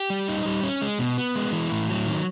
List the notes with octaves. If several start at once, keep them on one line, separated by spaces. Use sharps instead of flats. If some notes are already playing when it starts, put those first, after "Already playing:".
Already playing: G4
G3
D#4
G3
C#4
G#3
B2
B3
G#3
E3
A2
F#3
D#3